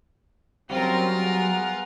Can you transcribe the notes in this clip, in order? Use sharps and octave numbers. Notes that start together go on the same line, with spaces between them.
F#3 G3 C4 C#4 F4 F#4 A#4
B3 G#4 F#5